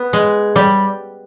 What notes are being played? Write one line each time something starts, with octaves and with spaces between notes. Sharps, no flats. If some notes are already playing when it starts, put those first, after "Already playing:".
Already playing: B3
G#3
G3